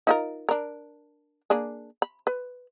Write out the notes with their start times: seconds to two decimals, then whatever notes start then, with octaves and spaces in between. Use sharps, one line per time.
0.07 D#4 F4 A#4
0.49 D4 A#4
1.50 A#3 D4 G#4
2.02 B5
2.27 B4